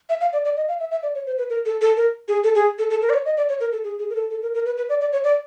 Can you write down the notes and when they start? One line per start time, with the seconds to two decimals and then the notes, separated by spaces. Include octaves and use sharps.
0.09 E5
0.21 F5
0.33 D5
0.45 D5
0.56 D#5
0.68 F5
0.80 E5
0.91 E5
1.03 D5
1.15 C#5
1.26 C5
1.38 B4
1.50 A#4
1.65 A4
1.81 A4
1.97 A#4
2.28 G#4
2.44 A4
2.55 G#4
2.79 A4
2.90 A4
3.02 A#4
3.10 D5
3.14 C#5
3.25 D#5
3.37 D5
3.49 C#5
3.60 A#4
3.72 A4
3.84 G#4
3.99 G#4
4.10 A#4
4.15 A4
4.30 A4
4.42 A#4
4.54 A#4
4.66 B4
4.77 B4
4.89 D5
5.01 D5
5.13 C#5
5.24 D5